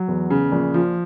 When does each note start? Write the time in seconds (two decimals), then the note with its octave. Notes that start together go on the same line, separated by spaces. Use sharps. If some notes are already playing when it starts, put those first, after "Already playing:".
Already playing: F#3
0.08 E2
0.30 C#3
0.52 A#1
0.74 F3